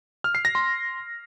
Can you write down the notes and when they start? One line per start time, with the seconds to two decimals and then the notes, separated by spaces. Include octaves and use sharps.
0.24 F6
0.35 C7
0.45 A#6
0.55 C6